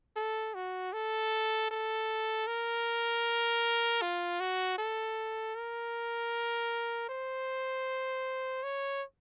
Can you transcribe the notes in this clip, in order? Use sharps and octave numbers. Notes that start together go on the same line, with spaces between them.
A4
F#4
A4
A4
A#4
F4
F#4
A4
A#4
C5
C#5